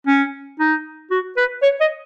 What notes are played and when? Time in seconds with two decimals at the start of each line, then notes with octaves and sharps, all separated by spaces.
0.07 C#4
0.59 D#4
1.11 F#4
1.37 B4
1.62 C#5
1.80 D#5